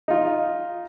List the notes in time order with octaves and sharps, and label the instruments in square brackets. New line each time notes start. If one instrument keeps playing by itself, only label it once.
[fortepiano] D#4 F4